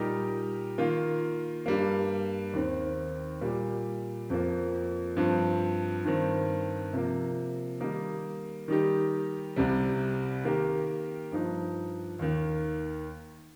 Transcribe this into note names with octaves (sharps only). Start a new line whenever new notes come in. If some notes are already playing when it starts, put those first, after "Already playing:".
Already playing: A#2 G3 D#4 G4 A#4
D#3 A#3 F4
G2 G3 A#3
D#2 D#3 C4
A#2 G3 A#3
F2 F3 A#3
G2 F3 C4
G2 D#3 C4
C3 F3 A#3
D#3 G3 A#3 D#4
D#3 G3 D#4 G4
C2 C3 G3
D#3 A#3 G4 A#4
G2 F3 D#4
D#2 D#3 A#3